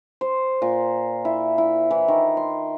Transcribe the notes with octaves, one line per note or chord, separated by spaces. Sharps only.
C5
A#2
E4
E4
E3
D#3
C6